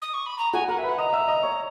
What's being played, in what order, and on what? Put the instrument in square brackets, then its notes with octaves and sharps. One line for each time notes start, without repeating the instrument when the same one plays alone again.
[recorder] D#6
C#6
B5
A#5
[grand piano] F#4 F#5 [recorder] G#5
[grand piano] A#4 A#5 [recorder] F#5
[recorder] E5
[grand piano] B4 B5
[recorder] F#5
[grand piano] D#5 D#6 [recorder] A#5
[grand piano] E5 E6
D#5 D#6
C#5 C#6